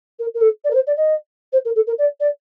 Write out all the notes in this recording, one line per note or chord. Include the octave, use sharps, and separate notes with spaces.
A#4
A#4
A4
D5
A#4
C5
D5
D#5
C5
A#4
A4
A#4
D5
D5